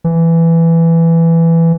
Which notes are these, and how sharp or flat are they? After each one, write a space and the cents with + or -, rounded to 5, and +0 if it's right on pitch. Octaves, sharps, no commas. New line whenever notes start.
E3 +10